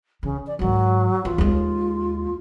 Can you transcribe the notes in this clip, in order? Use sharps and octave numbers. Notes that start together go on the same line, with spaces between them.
C#3 E3
D5
G#2 D#3 F#3
E3 F4
D#2 G#3